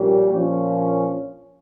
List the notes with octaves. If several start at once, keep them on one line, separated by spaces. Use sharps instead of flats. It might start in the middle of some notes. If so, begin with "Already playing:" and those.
Already playing: A#1 A#2 G3 C#4 G4
A#1 A#2 F3 C#4